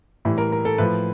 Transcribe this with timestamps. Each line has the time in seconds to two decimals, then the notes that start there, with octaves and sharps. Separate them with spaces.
0.25 A2 E3 G3
0.38 A#4
0.52 A#4
0.65 A4
0.78 A2 F3 B4